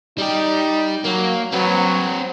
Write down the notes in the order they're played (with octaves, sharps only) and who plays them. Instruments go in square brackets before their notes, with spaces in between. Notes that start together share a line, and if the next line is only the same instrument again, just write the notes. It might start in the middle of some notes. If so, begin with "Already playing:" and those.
[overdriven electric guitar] G3 G4 [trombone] D#4
[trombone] F#3 [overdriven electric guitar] A#3
[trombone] F#3 [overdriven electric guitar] C4 B4